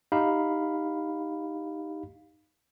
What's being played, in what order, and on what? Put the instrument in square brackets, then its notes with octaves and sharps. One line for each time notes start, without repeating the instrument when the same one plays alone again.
[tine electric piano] D#4 G4 F5 B5